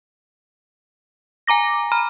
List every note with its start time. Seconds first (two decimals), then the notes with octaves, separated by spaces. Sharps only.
1.47 G#5 A#5 D6 A#6
1.92 A#5 B5 F6